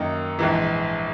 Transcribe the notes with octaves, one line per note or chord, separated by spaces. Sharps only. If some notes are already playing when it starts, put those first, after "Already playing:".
Already playing: F#2 D#3 A#3 D#4
A#1 G#2 E3